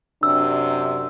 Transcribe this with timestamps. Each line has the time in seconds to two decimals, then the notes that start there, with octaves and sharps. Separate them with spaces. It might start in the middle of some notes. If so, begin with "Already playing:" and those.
0.23 F#2 C3 D4 E6